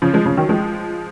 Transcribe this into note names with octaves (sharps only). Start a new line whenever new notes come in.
C#3 F3
F3 G#3
C#3 F3
D#3 F#3
F3 G#3